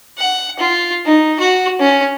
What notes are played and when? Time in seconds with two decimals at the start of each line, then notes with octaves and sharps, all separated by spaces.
0.18 F#5
0.59 F4
1.05 D#4
1.40 F#4
1.80 C#4